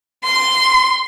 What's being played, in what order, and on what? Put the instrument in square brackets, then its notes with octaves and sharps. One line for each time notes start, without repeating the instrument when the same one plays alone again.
[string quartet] C6